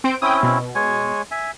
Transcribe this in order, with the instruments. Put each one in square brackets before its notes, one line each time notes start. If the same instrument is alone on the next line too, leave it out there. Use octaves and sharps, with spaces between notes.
[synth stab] C4 C5 D7
[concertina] C4 C#4 E4 [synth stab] G5 D#6
[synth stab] B2
[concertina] G#3 C#5 G#5
E5 G#5